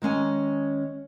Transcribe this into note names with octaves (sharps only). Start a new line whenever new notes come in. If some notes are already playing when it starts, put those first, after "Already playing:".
D#3 G#3 C#4 G#5